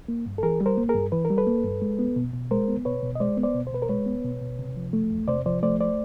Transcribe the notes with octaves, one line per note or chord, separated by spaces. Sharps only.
A#3
G2
A4
E3 G#4 A#4
G3
A#4 C5
A#3
G#4 A#4
G2
E3 B4
A#4
G3
A4 B4
A#3
G2
G#3
B3
B2
B2
G#3 A#4 C5
B3
B2 B4 C#5
B2
D#5
G#3 C5 D5
B3
C5 D5
B2
C5
B2 B4
A#4 C5
G#3 B4 C#5
B3
B2
B2
C3
F3
A3
E2
C3 C5 D5
F3 C5 D5
A3 C5 D5
C5 D5